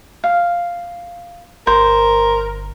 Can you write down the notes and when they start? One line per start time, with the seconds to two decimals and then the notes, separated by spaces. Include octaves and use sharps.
0.24 F5
1.67 G1 A#4 C5